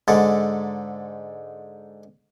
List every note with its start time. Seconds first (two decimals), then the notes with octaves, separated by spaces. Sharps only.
0.08 G#2 D3 G#3 A4